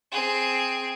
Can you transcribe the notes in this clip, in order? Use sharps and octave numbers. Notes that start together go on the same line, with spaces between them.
C4 G#4